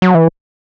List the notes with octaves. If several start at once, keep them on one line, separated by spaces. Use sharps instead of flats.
F#3
E3